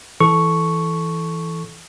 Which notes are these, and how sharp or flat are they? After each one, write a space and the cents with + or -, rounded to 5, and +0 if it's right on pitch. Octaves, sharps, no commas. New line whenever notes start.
E3 +0 A4 -10 C#6 +0